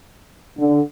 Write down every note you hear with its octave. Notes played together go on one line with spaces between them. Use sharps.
D3